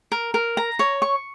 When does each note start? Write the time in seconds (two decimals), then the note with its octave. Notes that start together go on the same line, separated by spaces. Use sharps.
0.12 A#4
0.34 A#4
0.57 A#5
0.79 C#5
1.02 C#6